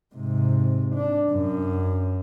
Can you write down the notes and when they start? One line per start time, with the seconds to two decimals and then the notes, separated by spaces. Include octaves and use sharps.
0.15 G#2 C3
0.95 D4
1.32 F#2